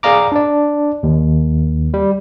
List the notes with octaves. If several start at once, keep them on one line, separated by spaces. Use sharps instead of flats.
G#4 D5 F5 A#5 D6
D4 D5
D#2
G3